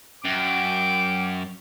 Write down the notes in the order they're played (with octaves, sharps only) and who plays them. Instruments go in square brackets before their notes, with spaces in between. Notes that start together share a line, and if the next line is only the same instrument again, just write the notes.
[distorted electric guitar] F#2 [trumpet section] G5 D6